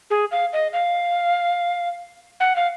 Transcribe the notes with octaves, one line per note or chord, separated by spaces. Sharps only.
G#4
F5
D#5
F5
F#5
F5